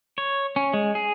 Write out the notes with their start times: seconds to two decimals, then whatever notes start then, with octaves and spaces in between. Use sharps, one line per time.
0.18 C#5
0.56 C#4
0.74 G#3
0.95 G#4